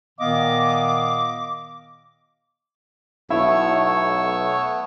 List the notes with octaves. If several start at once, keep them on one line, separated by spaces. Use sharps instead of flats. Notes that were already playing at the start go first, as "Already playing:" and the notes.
A#2 D#3 B3 D#5 F5 D6
B1 A3 B3 E4 C#5 C#6 E6